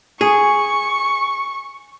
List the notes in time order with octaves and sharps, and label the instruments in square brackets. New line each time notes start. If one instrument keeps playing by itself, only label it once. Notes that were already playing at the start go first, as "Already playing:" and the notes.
[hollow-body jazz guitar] G#4 [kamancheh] C#6